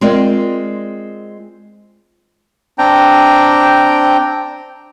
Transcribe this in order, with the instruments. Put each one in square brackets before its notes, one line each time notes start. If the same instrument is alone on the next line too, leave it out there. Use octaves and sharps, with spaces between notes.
[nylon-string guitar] G#3 C4 F4 A#4 D5
[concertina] C4 D4 G5 A#5